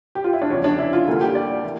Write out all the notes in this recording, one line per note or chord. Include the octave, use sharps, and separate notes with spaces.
G4
F4
E4
D4
E2 C#3 F3 C#4
D4
E4
F4
D2 D3 G3 A#3 F4
G4
D5
E3 A#3